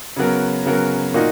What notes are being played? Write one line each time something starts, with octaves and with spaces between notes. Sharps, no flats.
C#3 F#3 B3 F#4 A#4
C#3 F#3 B3 F#4 A#4
A#2 A#3 D#4 F#4